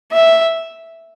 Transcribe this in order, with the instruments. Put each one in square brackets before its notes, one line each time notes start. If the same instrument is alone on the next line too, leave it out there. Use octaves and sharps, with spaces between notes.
[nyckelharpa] E5